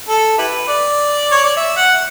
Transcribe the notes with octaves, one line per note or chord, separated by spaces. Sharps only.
A4
E4 G4 B4
D5
C#5
D5
E5
F#5